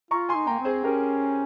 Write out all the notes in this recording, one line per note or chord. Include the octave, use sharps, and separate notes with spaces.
F4 A#5 C#6
G#5 C6
D#4
A#3 G5 A#5
C4
G#4 C5
C#4 G4 A#4